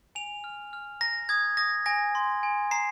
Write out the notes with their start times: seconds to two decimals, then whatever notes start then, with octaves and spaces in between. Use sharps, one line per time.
0.15 G#5 F7
0.44 F6
0.73 F6
1.01 A#5 A#6
1.29 D#6 G#6
1.57 D#6 A#6
1.86 G#5 A#6
2.15 C6
2.43 G#5
2.71 A#5 C7